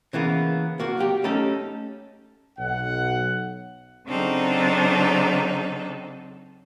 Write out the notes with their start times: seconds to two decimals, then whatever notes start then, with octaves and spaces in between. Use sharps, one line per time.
0.13 C#3 E3 A#3 B3
0.80 A#3 F#4
0.97 F#3 A#3 G4
1.24 A3 C#4 D#4 G4 A4
2.58 B1 F#5
4.07 C#3 F#3 C4 D4 D#4 A4